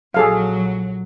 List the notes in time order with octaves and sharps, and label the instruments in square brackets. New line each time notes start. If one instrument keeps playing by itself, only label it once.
[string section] A#1 F#3 [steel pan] G#4 A4 F5